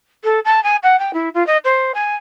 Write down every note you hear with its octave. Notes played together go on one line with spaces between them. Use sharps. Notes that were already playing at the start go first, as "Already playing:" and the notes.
A4
A5
G#5
F#5
G5
E4
F4
D#5
C5
G#5